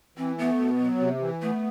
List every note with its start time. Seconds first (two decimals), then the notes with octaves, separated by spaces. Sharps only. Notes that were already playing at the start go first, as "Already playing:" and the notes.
0.17 E3 C4
0.38 A3 B3
0.59 B2
0.80 F#3
1.00 C3
1.21 E3
1.42 A3 B3